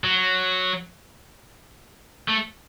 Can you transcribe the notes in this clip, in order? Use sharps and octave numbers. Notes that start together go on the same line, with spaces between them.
F#3
A3